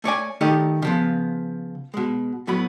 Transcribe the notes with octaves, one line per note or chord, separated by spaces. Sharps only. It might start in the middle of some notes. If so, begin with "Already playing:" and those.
A3 C#5 D5 G#5
D#3 A3 D#4 G4 D5 D#5
C#3 F3 B3
B2 G#3
A2 F#3 B3 B5